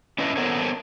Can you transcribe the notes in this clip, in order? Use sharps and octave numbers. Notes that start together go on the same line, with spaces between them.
C#4 D4 E4 B4 D#5
B3 D4 A4 A#4 C5 C#5